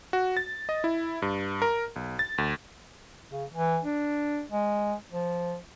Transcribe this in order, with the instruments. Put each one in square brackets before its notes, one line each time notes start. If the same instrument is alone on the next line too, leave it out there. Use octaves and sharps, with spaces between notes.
[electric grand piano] F#4
A6
D#5
E4
G2
A#4
B1
A6
D2
[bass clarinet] C#3
E3
D4
G#3
F3